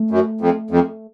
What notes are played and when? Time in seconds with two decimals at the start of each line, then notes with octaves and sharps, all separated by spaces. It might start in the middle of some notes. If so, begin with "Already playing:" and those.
Already playing: A3
0.11 F#2
0.41 F2
0.71 F2